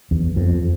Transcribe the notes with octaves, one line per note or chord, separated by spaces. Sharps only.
E2
F2